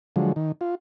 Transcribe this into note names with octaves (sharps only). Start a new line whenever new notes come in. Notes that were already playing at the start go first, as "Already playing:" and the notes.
D3 F3 F#3 G#3
D#3
F4